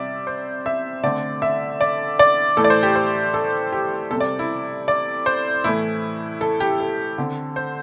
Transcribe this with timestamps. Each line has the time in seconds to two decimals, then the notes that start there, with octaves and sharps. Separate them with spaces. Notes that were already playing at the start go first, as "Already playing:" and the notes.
Already playing: C3 G3 C4 D5 E5
0.27 C5
0.66 E5
1.03 D3 A3 C4 D5
1.42 E5
1.81 D5
2.19 D5
2.57 A2 E3 A3 A4
2.64 D5
2.70 C5
2.83 G4
2.96 C5
3.34 A4
3.72 G4
4.11 C3 G3 C4 A4
4.20 D5
4.39 E4
4.88 D5
5.26 C5
5.64 A2 E3 A3 E4
6.41 A4
6.60 G4
6.80 A4
7.18 D3 C4
7.56 C5